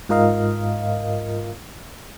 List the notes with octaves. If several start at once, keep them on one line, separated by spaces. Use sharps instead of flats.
G#2 F4 A#4 D#5 F5